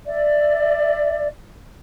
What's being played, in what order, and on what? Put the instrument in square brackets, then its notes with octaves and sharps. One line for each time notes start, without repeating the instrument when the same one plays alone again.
[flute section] D5 E5